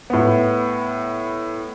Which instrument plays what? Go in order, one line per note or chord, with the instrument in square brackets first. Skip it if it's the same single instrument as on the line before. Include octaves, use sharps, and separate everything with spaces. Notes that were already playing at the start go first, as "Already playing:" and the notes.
[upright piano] A2 B3